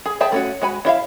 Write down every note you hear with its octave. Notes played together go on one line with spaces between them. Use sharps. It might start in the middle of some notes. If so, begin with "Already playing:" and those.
G#4
G#4 E5 G5 A5
A3 C#4 F#4
G#3 F#4 G#5 B5
D4 E4 E5 F5